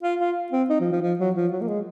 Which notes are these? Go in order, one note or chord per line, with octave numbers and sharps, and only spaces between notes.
F4
F4
C4
D#4
F3
F3
F3
F#3
F3
F#3
A#3
G#3